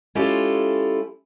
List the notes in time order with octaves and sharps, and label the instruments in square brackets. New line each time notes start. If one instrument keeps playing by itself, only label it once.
[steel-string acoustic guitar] G#3 C#4 E4 F4 G4 A4